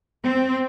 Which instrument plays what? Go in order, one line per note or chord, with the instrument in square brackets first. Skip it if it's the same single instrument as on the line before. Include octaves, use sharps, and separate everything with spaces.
[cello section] C4